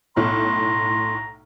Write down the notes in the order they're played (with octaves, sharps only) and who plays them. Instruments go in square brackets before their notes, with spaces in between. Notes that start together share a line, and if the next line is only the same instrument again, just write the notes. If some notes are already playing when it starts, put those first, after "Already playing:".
[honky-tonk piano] B1 A2 F6 [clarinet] A#5 [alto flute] C6